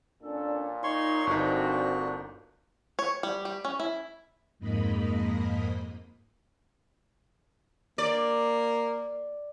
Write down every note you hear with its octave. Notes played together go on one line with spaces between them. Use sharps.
A#2 C#4 D4 A4
D#4 C#5 C6 C#6
G1 C4 D4 D#4 F#4
C#5
G3
G3
C#4
E4
F2 G#2 A#3 D#5 B5
A#3 D5